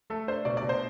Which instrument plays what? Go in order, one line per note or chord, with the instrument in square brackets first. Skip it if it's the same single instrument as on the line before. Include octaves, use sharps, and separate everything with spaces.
[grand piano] A3 [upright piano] A4
[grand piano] D4 [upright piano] C5
[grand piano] B2 [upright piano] D5
[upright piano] D5
[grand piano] B2
[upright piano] C5